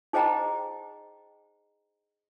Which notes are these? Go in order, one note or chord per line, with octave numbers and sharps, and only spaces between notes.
D#4 G#4 C5 D#5 G5 A#5